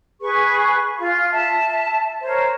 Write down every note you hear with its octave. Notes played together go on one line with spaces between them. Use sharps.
G#4 B4 C#6
F4 F5
E5 A5
A#4 C5 C#5